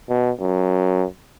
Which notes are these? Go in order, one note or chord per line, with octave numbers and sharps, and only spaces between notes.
B2
F#2